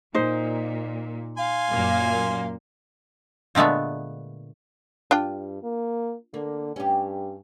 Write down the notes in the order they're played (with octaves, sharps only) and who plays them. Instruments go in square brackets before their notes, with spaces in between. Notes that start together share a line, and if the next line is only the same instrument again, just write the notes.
[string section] A#2 [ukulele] D#4 C5
[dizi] F5 [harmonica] G#5 C6
[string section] F#2 A#2 A#3
[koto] A#2 D3 G#3 A3 B3
[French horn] G2 [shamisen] D4 F4 G5
[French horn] A#3
[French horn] D3 [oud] A#3
[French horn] G2 [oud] C#4 G4